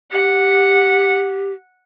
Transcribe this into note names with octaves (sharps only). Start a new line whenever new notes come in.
G4 F#5